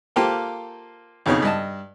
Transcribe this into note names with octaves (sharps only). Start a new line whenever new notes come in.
A#3 F4 G4 A4 C5 G5
B1 F2 C#3 D#4 C#5
G2 D#5 A5